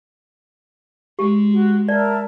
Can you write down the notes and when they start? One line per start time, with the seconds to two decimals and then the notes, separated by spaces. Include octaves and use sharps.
1.19 G#3 G4
1.52 F#4
1.89 A#4 D5 E5 A5